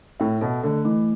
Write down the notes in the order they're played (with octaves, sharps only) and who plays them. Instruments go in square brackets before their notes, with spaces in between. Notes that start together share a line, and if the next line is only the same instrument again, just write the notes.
[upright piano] A2 [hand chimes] E5
[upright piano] B2 [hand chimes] A4
[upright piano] D3 [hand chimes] A3
[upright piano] E3 [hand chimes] A3